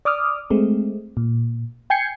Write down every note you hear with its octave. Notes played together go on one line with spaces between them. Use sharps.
D5 D6 D#6 F6
G#3 A3 C4
A#2
G5 G#5 G6 G#6 C7 C#7